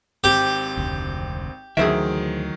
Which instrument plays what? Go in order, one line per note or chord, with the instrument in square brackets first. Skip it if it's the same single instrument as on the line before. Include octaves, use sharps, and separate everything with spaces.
[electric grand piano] G#1 C4 [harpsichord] G4
[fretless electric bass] F1 D2
[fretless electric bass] D2 E3 [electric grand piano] D#3 F#3 D7 [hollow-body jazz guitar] G#4 C5 E5